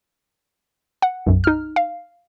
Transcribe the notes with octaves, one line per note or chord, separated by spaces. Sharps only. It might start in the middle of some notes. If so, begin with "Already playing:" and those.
F#5
B1 F#2
D#4 F6
F5